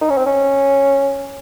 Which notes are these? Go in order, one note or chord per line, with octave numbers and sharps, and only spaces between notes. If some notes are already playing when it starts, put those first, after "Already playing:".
D#4
C#4
C4
C#4